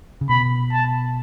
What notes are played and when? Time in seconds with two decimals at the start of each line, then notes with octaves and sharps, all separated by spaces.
0.21 C#3
0.29 B2 B5
0.72 A5